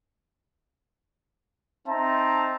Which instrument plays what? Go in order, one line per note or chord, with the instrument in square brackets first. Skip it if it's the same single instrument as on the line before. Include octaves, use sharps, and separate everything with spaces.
[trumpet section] C4 D#4 E5 A5 A#5